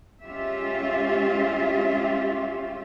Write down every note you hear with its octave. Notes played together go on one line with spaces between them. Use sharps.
G#3 C#4 F4 G4 E5